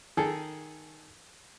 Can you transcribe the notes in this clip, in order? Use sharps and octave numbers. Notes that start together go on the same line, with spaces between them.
D#3 G#4 A4